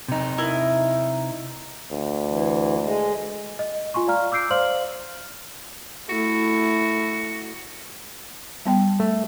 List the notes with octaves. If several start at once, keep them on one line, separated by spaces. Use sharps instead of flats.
C3 D#4
E4 A#4 D#5
D2
E3
G#3
D#5
F4 G#5 C6 C#6
D5 F5 A#5 F6
D6 E6 G6 C7 D7
C5 D5 F5 C6 F6 F#7
A3 E4 F#4
G3 B3 G5
A3